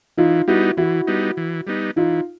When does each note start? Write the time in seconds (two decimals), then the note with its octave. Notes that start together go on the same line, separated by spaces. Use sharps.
0.17 E3 D#4 F4
0.47 G3 B3 D#4 E4 F#4
0.77 E3 E4 F#4
1.07 G3 B3 D#4
1.37 E3
1.67 G3 B3 D#4
1.96 E3 D#4 F4